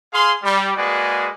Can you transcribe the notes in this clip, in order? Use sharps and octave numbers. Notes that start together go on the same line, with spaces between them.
G#4 F5 C6
G3
G#3 A#3 F#4 G#4 B4 D5